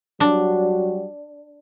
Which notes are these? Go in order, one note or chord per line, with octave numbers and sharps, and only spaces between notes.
F#3 G3 D4 F#4